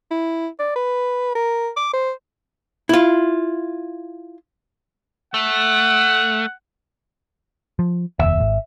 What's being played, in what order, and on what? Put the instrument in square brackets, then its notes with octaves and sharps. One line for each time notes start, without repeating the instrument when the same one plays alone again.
[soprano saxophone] E4
D5
B4
A#4
D6
C5
[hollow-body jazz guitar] E4 F4
[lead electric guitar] A3 [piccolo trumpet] F#5
[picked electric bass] F3
[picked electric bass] F1 D#2 [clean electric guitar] E5
[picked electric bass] G#1